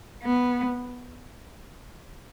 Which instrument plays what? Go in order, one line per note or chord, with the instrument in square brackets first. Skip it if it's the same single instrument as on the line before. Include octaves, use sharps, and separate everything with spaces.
[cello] B3